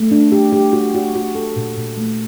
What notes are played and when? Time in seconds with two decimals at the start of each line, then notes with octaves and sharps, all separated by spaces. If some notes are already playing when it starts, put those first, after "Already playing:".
Already playing: A3
0.11 D4
0.32 G4
0.52 G4
0.73 F#4
0.95 F#4
1.15 F#4
1.35 A4
1.56 A#2
1.76 A#2
1.98 A3